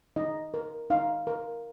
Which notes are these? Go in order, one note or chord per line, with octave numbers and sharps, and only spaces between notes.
D#4 D#5
A#4
D#4 F5
A#4